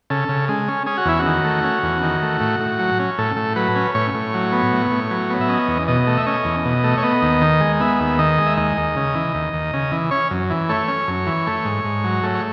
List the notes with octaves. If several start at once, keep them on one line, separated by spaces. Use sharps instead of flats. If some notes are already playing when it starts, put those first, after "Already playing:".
C#3 A4
C#3
G#3
C#4
C#4 G#4
F#4
E2 E4
F#4
D#3
A3
C#4
E2
D#3
A3
A2
A2
F#3
C#4
A2 A4
A2
F#3 B4
C#4
A2 C#5
A2
F#3
B3
A2
A2
F#3
B3
E5
C#4 D#5
E2
B2 D#5
A3
E5
C#4 D#5
E2
B2
A3
C#5
B3 D#5
D#2
D#3
G#3
B3 E5
D#2
D#3 D#5
G#3
E5
D#2 D#5
D#2
C#3
E3
D#2
D#2
C#3
E3
C#4 C#5
F#2
E3
A3 C#5
C#4
F#2
E3
A3
G#2
G#2
F#3
A3
C#5